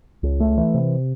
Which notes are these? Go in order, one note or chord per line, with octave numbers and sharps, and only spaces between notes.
C#2
A3
E3
C3